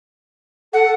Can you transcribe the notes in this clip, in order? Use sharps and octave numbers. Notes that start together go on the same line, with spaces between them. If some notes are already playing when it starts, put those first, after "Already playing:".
A4 F#5